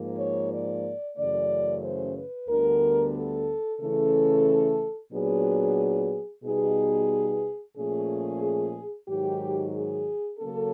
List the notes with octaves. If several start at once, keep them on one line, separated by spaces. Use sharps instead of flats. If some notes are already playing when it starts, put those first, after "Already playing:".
Already playing: G#2 F3 A#3
C#5
D5
F#2 C#3 E3 A3 D5
C5
B4
D2 D3 G3 B3 A#4
A4
C#3 E3 A3 C#4 A4
A#2 F#3 B3 D4 G#4
B2 G3 B3 D#4 G#4
A#2 F3 A3 C#4 G#4
G#2 D#3 F#3 G4
G#4
C#3 F#3 A#3 C#4 A4